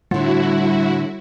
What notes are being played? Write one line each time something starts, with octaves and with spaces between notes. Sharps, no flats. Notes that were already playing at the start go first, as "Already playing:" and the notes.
A2 D3 G3 E4 F#4